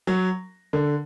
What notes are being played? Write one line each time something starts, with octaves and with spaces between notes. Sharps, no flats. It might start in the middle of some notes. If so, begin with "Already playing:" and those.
F#3
D3